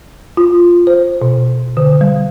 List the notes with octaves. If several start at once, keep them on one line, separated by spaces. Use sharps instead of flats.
F4
C5
B2
D3
G3